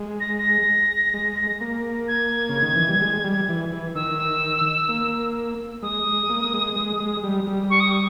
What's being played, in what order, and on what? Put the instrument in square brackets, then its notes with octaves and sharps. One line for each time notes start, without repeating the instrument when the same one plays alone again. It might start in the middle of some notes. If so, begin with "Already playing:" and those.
Already playing: [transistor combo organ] G#3
[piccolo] A#6
A#6
[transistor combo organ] G#3
A#3
[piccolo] G#6
[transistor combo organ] C#3
D#3
E3
G3
G#3
G3
E3
E3
[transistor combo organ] D#3 [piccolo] E6
[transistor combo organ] A#3
[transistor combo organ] G#3 [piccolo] D#6
[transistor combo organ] G#3
A#3
A#3
G#3
G#3
G#3
G3
G3
[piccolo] C#6
D#6
C#6